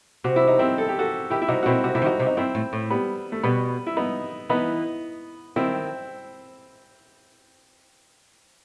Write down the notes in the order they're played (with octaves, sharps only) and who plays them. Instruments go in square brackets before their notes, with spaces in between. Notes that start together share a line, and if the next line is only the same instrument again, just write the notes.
[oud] C3 [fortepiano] F#4
[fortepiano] E4
D#4
C4 E4
A4
G4
F#4 A4
[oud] D#3 [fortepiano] E4 G4
[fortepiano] E4
[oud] C3 [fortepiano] D#4 F#4
[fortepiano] F#4
[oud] B2 [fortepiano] C4 E4
[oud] C3 [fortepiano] F#4
[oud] C3 [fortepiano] E4
[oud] D#3
[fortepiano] D#4 F#4
[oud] C3
[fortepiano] D#4
[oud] G2 [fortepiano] C4 E4
[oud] A2
A2
[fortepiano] G3 B3
A3
[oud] B2 [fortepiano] G3 B3
[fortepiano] E4
B3 D#4
[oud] E3 [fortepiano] B3 D#4
[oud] D#3 [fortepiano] C4 E4